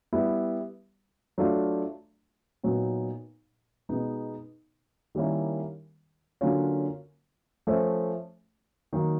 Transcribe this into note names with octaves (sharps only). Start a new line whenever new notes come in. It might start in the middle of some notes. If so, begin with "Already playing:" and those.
G3 B3 E4
F#3 A3 D4 F4
A#2 F#3 B3 D#4
B2 G#3 B3 D#4
D#3 G3 A#3 C#4 E4
D3 F#3 A#3 C#4 F4
F3 A3 C#4
D#3 F#3 A#3